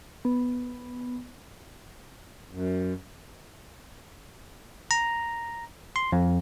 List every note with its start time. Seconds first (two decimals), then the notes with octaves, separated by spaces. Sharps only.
0.25 B3
2.51 F#2
4.91 A#5
5.96 C6
6.12 F2